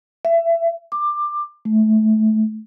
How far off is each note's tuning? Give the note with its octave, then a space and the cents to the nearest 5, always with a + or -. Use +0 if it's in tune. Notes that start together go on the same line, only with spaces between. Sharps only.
E5 +25
D6 +20
A3 -20